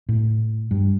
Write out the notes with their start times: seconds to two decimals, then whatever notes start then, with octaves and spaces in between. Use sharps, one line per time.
0.09 A2
0.71 G2